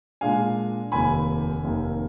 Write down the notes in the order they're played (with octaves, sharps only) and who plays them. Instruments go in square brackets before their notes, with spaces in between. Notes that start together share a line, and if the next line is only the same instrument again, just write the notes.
[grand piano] A#2 G#3 D4 [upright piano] F5 G#5
[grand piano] F1 D#2 D#3 [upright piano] G#5 B5
[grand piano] F1 D#2 D#3